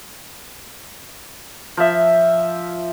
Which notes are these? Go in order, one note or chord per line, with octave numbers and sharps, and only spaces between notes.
F3 E5